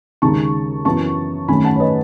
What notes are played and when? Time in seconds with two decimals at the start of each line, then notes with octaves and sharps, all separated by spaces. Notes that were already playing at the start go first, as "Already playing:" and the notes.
0.22 D#2 C#3 G#3 D#4 A5 C#6
0.85 F#2 E3 B3 A5 C#6
1.48 F#2 D#3 A3 C#4 G#5 B5
1.64 F#5 A5
1.76 C#5
1.80 B4 D#5